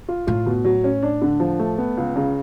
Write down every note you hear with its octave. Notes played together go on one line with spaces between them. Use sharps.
F4
A2 F4
B2
F#3
C#4
D4
D3
F3
A3
B3
C#2
C#3